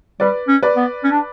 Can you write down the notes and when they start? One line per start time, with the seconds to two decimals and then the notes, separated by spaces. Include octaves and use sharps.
0.20 G3 B4 D5
0.48 C#4
0.63 B4 D5
0.76 B3
1.04 C#4
1.11 D4